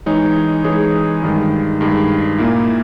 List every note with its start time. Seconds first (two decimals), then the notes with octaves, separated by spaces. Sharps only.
0.06 E3 G#3 D#4 G#4 C#5
0.64 E3 G#3 D#4 G#4 C#5
1.22 G2 D#3 G#3
1.81 G2 D#3 G#3
2.39 A#2 A#3 E4